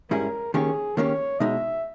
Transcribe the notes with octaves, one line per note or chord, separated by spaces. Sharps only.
G#2 G3 C#4 E4 G#4 A#4
D#3 A#3 C#4 G4 G#4
D#3 A#3 C#4 G4 C#5
B2 G#3 D#4 E5